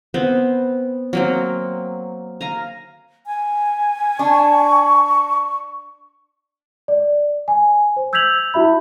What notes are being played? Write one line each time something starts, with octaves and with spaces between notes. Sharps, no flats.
B3 C4 C5
F#3 A#3 C4
F5 G#5 A#5
G#5
D4 C#6
D5
G#5
C5
E6 G6 G#6 B6 F7 F#7
E4 F#4 E5 B5